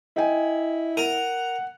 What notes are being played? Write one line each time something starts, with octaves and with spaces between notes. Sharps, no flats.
E4 D#5 G5 G#5
A#4 F#5 D#7